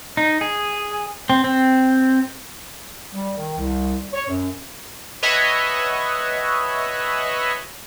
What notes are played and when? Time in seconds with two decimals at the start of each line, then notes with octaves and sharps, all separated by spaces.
0.17 D#4
0.41 G#4
1.30 C4
1.44 C4
3.13 G3
3.36 D#3
3.58 C2
4.14 C#5
4.28 F#2
5.23 B4 C#5 D#5 E5 F#5 G#5